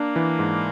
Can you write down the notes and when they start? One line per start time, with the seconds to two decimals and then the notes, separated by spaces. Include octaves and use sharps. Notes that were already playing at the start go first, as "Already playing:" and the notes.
Already playing: A#3 D4
0.16 E3
0.39 G#2